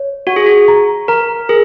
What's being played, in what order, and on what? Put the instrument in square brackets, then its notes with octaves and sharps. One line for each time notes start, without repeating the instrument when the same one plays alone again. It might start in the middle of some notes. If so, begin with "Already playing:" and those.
Already playing: [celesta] C#5
[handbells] F#4 [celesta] F#5
[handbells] G#4
F#4
[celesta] A#5
[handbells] A#4 [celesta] A#5
[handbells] G#4 [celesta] A#4